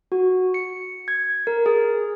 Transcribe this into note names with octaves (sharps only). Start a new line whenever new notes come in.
F#4
C#7
G#6
A#4
G#4